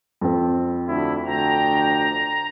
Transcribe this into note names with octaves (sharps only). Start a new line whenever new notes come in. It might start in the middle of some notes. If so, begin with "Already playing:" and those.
F2 C4
D2 E4
D2 G5 A#5